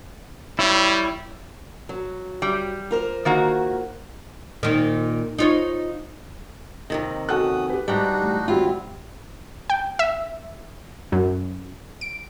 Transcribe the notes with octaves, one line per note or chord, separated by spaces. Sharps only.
G3 E4 C#5
F#3
G3
F4 A#4 C5
D#3 A#3 F#4
A#2 D#3
D#4 F4 C#5
D#2 C3 D#3
C#4 F#4 A4 D#6 F#6
G4 B4
G#2 G3 D4 D#4 F#4
A1
G#1 F#3 G3 C4 E4 F4
G5
E5
F#2
D7